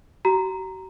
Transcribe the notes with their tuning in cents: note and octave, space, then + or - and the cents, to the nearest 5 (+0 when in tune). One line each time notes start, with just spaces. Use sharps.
F#4 +45 A#5 +0